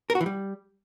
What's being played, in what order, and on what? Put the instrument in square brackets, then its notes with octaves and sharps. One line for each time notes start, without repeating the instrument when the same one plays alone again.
[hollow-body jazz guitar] A#4
F#4
E3
G3